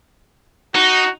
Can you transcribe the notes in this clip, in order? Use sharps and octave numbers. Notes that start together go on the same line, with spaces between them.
D#4 F#4